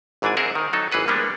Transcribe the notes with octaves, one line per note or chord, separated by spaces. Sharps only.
G#1 G#2 E3 D4 D5 G#5
C4 D4 G#4 A#4 E5 F#5
D#3
F#3 D#4 A4
G#1 E3 G#4 B4 F#5
G3 G#3 A#3 B3 D4